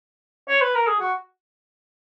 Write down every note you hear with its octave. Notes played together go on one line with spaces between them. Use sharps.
C#5
B4
A#4
G#4
F#4